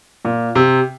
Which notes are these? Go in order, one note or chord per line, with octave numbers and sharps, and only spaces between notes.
A#2
C3